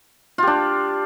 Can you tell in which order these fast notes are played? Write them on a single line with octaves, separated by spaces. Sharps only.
F4 G4 D4